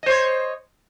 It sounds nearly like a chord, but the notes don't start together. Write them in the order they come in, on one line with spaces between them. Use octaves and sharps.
D#5 C5 C#5